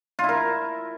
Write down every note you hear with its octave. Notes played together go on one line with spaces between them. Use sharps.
F4
E4
A#4